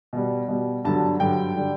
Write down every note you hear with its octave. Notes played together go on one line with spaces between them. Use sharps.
B2 G3
B2 G3
G2 D3 F#3 A5
G2 D3 F#3 G5
D3 G3